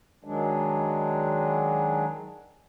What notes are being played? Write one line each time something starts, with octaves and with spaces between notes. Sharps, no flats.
D#3 F#3 G#3 D4